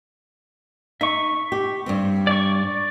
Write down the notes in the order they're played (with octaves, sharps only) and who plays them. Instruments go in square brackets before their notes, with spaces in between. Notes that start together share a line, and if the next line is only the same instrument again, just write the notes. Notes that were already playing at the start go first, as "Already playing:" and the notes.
[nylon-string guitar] D#4 [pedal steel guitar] E5 C#6
[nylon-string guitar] G4
G2 G3 C4
[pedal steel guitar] D5 C#6